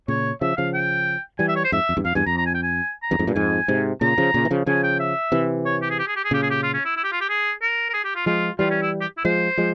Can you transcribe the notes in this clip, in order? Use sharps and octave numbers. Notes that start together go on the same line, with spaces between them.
A#2 C#3 C#5
C#3 F3 E5
C#3 F3 F5
G5
E3 G3 G#5
E5
C#5
C5
F2 G#2 E5
F2
E2 G2
F2 F5
E2 G2 G#5
F2 A#5
A#5
G#5
G5
G#5
A#5
E2 G2
F2 G#2
G2 A#2
F2 G#2 G#5
G#2 C3
A#2 C#3 A#5
C#3 F3
A#2 C#3
E3
C#3 F3
C#3 F3 G#5
G5
E5
C3 E3
C#5
G4
G#4
G4
G#4
G4
G#4
A#2 C#3 G4
G#4
G4
F4
C#4
E4
E4
G4
F4
G4
G#4
A#4
A#4
G#4
G4
F4
F3 G#3 F4
E3 G3 F4
C#4
E4
G4
E4
F3 G#3 C5
F3 G#3